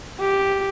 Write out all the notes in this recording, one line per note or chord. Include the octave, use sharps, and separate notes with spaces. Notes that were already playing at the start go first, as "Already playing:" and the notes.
G4